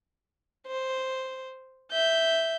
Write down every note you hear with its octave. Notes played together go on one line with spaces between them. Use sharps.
C5
E5 G6